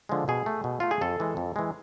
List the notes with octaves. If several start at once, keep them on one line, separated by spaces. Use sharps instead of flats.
D3 F3 G#3
B2 G#4
A3
B2
A3 F4
G#4
F2 A4
E3 G#3
F2
E3 G#3